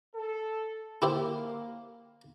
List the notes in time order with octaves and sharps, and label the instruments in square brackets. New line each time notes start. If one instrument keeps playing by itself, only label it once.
[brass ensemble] A4
[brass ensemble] A#3 [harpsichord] E4 G4 C5